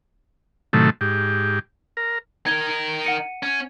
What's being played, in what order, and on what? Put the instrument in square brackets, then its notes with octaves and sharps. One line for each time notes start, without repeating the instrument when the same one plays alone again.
[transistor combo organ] A2 C3 D#3 F#3 A3
G#2 G4
A#4
[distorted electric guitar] D#4 A#4 [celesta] G#6 G7
[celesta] F#5 C#7 D#7
[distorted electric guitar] C#4